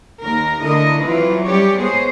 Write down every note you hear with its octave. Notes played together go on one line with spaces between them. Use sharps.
D#2 A#4
D3 A3 D4 E4 A#4 D#5
E3 F#3 C4 E4 F4 B4
G3 C#4 G4 C#5 D5
G#3 B3 G#4 C5 C#5